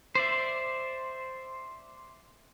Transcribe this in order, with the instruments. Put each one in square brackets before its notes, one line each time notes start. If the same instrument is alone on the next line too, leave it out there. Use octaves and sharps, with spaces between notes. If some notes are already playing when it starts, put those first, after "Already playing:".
[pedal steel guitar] C5 D5 E5